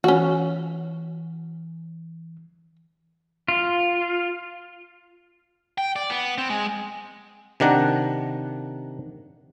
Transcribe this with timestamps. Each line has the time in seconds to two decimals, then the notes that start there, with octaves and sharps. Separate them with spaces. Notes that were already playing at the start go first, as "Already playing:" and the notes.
0.04 E3 C#4 F#4
3.48 F4
5.78 G5
5.96 D5
6.10 B3
6.38 C4
6.50 G#3
7.60 C3 D#3 D4 F#5 A#5